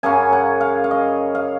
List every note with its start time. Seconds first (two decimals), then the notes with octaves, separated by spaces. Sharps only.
0.03 F#2 C#3 F#3 C#4 G#5
0.32 F#5
0.61 F5
0.84 F5
0.91 D#5
1.35 F5